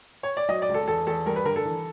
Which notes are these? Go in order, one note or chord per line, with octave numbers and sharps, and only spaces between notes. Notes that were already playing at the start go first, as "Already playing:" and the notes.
C#5
D5
F#3 D#5
D5
C#2
A4
E2 A4
E2 A4
G2 A#4
B4
D3 A#4
A4
E3